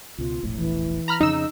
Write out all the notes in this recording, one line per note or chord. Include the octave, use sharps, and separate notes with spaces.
C#2 B2 F4
E1 A#1 A2
E3
A#5 B5 F6
F2 C#3 D#4 E6